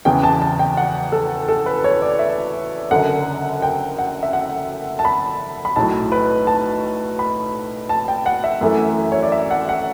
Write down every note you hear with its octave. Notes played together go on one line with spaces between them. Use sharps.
E2 C#3 E3 B3 G5
A5
A5
G5
F#5
A4
A4
B4
C#5
D5
E5
F#1 F#2 D3 F#5
G5
F#5
E5
F#5
A5
B5
B5
B1 A2 F#3 A5
B4
A5
B5
A5
G5
F#5
E5
F#2 E3 A3
C#5
D5
E5
F#5
F#5